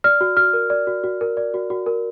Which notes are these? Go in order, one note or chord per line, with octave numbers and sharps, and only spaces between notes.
D5 F6
F#4
F#4 F6
A#4
D5
F#4
F#4
A#4
D5
F#4
F#4
A#4